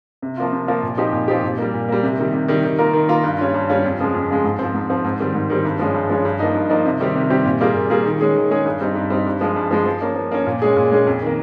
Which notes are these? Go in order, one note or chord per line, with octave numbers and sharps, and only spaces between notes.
C3
F3 A#3 F4
C3
F3 A#3 F4
A#2
F3 C4 D#4 G4
A#2
F3 C4 D#4 G4
A#2
G3 A#3
A#2
G3 A#3
C3
D#3 G3
C3
D#3 G3
D#3
A#3 F4 A#4
D#3
A#3 F4 A#4
G2
G3 C#4 F4
G2
G3 C#4 F4
F2
C#3 F3 G#3
F2
C#3 F3 G#3
G#2
F3 C4
G#2
F3 C4
G#2
D#3 G3 C4
G#2
D#3 G3 C4
G2
F3 G#3 C#4
G2
F3 G#3 C#4
G2
F3 A#3 D#4
G2
F3 A#3 D#4
C3
D#3 G3 C4 G4
C3
D#3 G3 C4 G4
A#2
G3 A#3 F4 G#4
A#2
G3 A#3 F4 G#4
D#3
G#3 C#4 G#4
D#3
G#3 C#4 G#4
G2
G3 C4 D#4
G2
G3 C4 D#4
G2
F3 G#3
G2
F3 G#3
F3
A#3 C#4
F3
A#3 C#4
A#2
G#3 C#4 G#4
A#2
G#3 C#4 G#4
F2
D#3 A#3